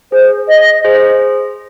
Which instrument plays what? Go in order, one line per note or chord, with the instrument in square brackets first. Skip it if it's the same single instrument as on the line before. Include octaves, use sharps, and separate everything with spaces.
[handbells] G#4 [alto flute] C5
[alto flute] D#5
[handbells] G#4 C5